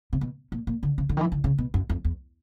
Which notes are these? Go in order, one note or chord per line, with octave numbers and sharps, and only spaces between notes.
C3
B2
A#2
A#2
D3
C#3
D3
D#3
E3
D3
C#3
B2
F#2
F2
E2